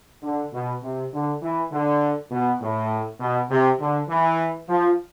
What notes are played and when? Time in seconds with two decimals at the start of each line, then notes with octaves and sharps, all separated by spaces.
0.23 D3
0.53 B2
0.83 C3
1.13 D3
1.42 E3
1.72 D3
2.31 B2
2.61 A2
3.20 B2
3.50 C3
3.80 D3
4.09 E3
4.69 F3